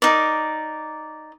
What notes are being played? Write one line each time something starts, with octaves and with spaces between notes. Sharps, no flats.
D#4 A#4 D5